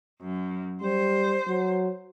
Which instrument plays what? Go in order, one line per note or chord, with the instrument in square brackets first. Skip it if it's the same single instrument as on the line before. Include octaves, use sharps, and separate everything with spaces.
[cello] F#2
[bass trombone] G3 [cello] C5
[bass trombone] F#3